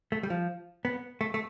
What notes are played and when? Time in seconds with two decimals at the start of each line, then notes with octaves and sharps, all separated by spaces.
0.12 A3
0.23 G3
0.30 F3
0.85 B3
1.21 A3
1.34 A3